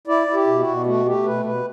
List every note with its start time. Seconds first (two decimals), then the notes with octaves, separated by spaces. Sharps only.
0.07 E4 D5
0.27 E4
0.34 G4
0.47 B2
0.60 F#4
0.67 B2
0.86 A3 F#4
1.06 A3 G4
1.25 B2 B4
1.45 B2 B4